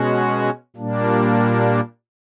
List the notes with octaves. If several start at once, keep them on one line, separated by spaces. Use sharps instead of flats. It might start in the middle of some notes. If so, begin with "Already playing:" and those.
Already playing: B2 G#3 C#4 F#4
A#2 G3 A#3 D4